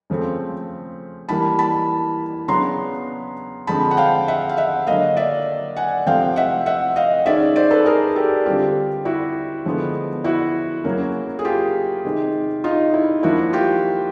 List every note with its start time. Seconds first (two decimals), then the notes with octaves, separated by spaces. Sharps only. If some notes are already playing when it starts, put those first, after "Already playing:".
0.10 C#3 F3 A3 C4
1.29 E3 G3 A#3 A5 B5
1.59 A5 B5
2.48 C#3 F#3 B3 D4 A#5 C6
3.67 D3 F3 G#3 C4 A5 B5
3.91 F#5
3.97 F5 G5
4.28 E5 F#5
4.49 F5
4.57 E5 F#5
4.87 D3 F#3 A#3 D#5 F5
5.17 D5 E5
5.77 F#5 G#5
6.06 C3 F3 A3 C4 F5 G5
6.36 E5 F#5
6.66 E5 F#5
6.96 D#5 F5
7.26 D#3 G#3 C#4 D5 E5
7.56 C5 D5
7.71 A4 B4
7.86 G#4 A#4
8.16 G4 A4
8.45 D3 G3 C4 F4 G4
9.05 E4 F#4
9.65 D3 F3 G#3 B3
10.24 E4 F#4
10.84 C#3 F#3 A#3 C#4
11.39 G#4
11.45 F4 G4
12.05 C3 D#3 G#3 C4
12.64 D#4 F4
12.93 E4
13.23 F3 A#3 D4 E4 F#4
13.53 F4 G4